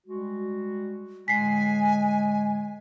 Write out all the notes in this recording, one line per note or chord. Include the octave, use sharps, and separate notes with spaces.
G3 G#3 F#4
A2 D3 G#3 G#5 B6 C7